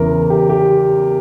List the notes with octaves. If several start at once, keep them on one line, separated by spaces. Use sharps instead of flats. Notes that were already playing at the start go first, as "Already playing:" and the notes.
Already playing: E2 C#3 E3 A#4
G4
G4